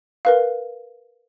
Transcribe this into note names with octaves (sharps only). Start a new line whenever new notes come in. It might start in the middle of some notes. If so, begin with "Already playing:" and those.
A#4 B4 F5